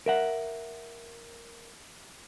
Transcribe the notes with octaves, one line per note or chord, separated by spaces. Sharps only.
A#4 E5 F#5